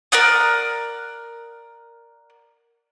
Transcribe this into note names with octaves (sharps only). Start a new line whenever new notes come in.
A#4 D5 F#5 D#6